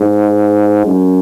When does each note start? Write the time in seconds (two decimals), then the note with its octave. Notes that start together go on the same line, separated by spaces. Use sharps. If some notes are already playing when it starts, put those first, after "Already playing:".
Already playing: G#2
0.86 F#2